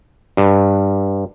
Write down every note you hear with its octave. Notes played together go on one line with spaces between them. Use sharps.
G2